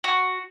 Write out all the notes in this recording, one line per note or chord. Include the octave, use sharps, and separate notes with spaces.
F#4